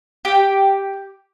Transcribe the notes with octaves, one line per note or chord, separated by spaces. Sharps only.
G4 G5